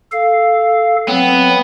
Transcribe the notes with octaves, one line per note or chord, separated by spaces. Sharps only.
A4 F5
F#3 B3 C4